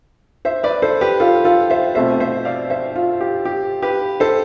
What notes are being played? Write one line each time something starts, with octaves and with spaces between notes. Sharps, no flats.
C5 E5
B4 D5
A4 C5
G4 B4
F4 A4
F4 A4
C5 E5
B2 A3 C4 F4 C5 E5
C5 E5
D5 F5
C5 E5
F4
G4
G4
G4 B4
A4 C5